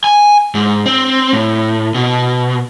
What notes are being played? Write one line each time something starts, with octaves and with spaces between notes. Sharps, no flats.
G#5
G#2
C4
A2
B2